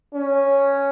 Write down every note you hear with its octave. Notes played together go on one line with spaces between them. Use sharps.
C#4